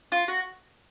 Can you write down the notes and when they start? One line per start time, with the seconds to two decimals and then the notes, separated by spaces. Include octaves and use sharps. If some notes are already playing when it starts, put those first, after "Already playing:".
0.12 F4
0.28 F#4